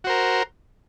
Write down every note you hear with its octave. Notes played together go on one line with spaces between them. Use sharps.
F#4 A#4 C5